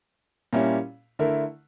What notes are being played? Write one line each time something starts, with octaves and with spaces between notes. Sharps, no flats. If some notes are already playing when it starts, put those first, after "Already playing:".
A#2 G3 C#4 E4
D3 A3 E4 A#4